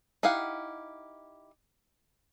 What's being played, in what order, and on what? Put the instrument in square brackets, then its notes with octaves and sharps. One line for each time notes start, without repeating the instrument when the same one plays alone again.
[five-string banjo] D#4 E4 G4 F5 F#5